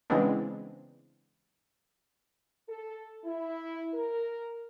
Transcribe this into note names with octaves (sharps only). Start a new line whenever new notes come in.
C#3 E3 G#3 B3 C4 D4
A4
E4
A#4